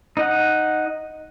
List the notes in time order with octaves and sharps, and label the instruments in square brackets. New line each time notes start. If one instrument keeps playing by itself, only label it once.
[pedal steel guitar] D#4 D#5 F#5